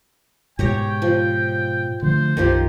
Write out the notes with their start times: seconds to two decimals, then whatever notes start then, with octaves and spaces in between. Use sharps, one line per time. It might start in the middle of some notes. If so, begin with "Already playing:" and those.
0.59 G#2 B2 G#3 G4 C#5 G5 A#5
1.02 F3
2.02 D3 F3 A3 C5
2.37 B1 F#2 D#3 F3 G4